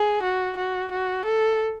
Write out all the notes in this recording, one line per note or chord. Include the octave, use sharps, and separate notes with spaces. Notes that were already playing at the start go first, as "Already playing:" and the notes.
Already playing: G#4
F#4
F#4
F#4
A4